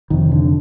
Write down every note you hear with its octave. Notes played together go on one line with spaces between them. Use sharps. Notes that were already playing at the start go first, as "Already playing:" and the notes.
F2 C3 D#3
D3